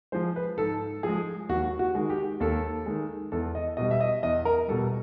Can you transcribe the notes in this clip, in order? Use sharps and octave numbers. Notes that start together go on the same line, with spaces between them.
F3 G#3 C5
B4
G#2 A4
F3 G#3 G#4
D#2 F#4
F#4
D#3 G#3
G4
D#2 A4
D#3 G#3
E2 A4
D#5
B2 G3 D#5
E5
D#5
E2 D#5
A#4
B2 G3 A4